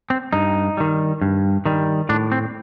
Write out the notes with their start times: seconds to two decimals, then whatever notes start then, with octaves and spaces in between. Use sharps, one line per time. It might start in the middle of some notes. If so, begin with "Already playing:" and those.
0.10 C4
0.33 G2 D#4
0.77 D#3 G3
1.22 G2
1.66 D#3 G3
2.09 A2 D4
2.32 C4